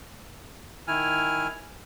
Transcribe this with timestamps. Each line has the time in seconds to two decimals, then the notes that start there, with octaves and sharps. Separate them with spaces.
0.88 D#3 E4 G#5 F6